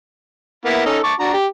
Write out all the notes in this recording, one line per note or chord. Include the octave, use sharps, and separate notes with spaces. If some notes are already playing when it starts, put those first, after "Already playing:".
A#3 B3 E4
C#4 D#4 A4
A5 C#6 D6
D4 F#4 A#5
G4